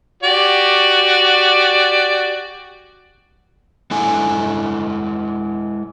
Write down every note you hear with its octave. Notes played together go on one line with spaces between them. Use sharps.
F#4 G4 D5
G#3 E4 A4 F#5 G#5